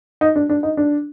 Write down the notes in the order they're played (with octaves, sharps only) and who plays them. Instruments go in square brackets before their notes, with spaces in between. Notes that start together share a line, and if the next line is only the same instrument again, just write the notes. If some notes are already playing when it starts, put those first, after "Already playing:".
[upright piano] D#4
D4
D4
D#4
D4